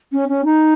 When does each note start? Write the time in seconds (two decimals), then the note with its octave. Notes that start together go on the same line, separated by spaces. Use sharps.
0.12 C#4
0.28 C#4
0.44 D#4